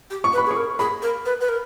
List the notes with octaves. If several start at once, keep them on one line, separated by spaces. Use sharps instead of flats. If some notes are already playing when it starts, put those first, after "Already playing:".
G4
C#6
B4
B5
G#4 C#6
A#4
G#4 B5
A#4
B4
B4
A#4